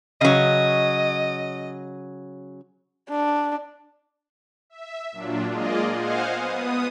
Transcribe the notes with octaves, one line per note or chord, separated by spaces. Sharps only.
C#3 F#3 D#5
D4
E5
A#2 F#3 D4 F4
G#3 A#3 F4 G#4 D5 D#5
C5 D#5 F5 F#5 G#5
B3 D#6